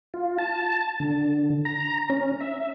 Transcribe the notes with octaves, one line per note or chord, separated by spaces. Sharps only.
F4
A5
D3
A#5
C#4
E5